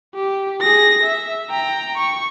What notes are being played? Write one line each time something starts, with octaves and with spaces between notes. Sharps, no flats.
G4
G#4 A#6
E5
G5 A#5
C#6